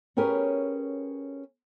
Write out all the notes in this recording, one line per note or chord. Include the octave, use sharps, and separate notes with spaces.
C#4 G4 G#4 A#4 B4 C#5